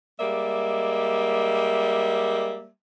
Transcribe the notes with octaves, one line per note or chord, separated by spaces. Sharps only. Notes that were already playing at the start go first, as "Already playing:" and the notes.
G3 G#3 A#3 D5 E5